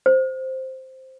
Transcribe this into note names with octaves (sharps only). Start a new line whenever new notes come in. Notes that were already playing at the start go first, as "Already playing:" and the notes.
C5